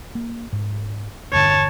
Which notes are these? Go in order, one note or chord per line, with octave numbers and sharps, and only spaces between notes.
A#3
G#2
E1 G2 D3 C#5 A5